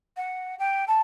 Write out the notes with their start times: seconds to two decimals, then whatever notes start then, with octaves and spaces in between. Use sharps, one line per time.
0.17 F#5
0.59 G5
0.88 A5